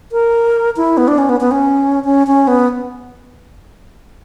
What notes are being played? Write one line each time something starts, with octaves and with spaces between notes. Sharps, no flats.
A#4
E4
B3
D4
C#4
B3
B3
C#4
C#4
C#4
B3